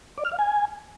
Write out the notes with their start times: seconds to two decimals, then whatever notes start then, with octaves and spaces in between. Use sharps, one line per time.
0.18 D5
0.25 F6
0.32 F5
0.39 G#5